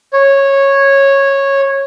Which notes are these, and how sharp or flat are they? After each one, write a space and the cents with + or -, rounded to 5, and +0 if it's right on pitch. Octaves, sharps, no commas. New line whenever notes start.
C#5 -10